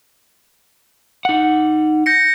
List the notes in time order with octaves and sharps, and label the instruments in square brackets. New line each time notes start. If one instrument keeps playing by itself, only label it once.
[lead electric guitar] D#4 F#5
[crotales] G6 A#6 C#7